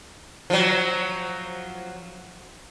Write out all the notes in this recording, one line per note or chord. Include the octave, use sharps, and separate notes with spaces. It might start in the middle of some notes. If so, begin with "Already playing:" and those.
F3 F#3